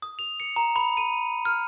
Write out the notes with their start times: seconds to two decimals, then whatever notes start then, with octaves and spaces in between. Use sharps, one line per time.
0.02 D#6
0.19 F7
0.40 C#7
0.56 A#5
0.76 B5
0.97 D#7
1.45 F6